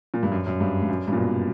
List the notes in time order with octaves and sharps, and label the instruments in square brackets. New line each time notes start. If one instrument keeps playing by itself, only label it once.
[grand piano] A#2
G2
F#2
F#2
G2
G2
F#2
G2
A#2
B2